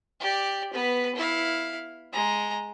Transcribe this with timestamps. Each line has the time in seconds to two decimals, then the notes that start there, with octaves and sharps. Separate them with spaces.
0.20 G4 D5
0.73 B3 B4
1.15 E4 F5
2.12 G#3 A#5